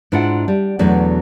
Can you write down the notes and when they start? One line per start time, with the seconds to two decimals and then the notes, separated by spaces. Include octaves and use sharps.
0.12 G#2 D4 E4 F4 F#5
0.48 G3
0.79 E2 B2 F#3 A3 D4